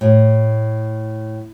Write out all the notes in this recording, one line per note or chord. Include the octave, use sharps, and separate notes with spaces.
A2